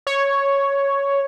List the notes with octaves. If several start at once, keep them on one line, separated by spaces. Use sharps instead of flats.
C#5